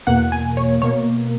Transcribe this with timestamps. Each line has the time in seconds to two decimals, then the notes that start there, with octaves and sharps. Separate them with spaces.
0.07 E2 B2 A#3 F#5
0.32 G#5
0.57 C#5
0.82 B2 A#3 C#5